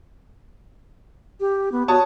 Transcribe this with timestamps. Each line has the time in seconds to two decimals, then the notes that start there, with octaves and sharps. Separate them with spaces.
1.40 G4
1.72 B3
1.88 F#4 C#5 A5 D#6